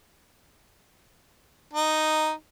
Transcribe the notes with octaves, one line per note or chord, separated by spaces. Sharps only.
D#4